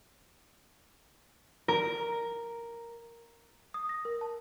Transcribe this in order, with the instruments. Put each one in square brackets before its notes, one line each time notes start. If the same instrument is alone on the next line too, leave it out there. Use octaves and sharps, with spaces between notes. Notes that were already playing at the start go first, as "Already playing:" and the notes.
[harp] A#4
[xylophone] D#6
A#6
A#4
A5